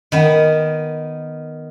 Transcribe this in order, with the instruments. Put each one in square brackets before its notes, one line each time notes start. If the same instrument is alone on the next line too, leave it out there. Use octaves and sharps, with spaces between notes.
[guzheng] D#3 B3